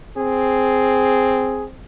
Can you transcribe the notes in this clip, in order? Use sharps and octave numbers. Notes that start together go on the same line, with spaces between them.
C4 G#4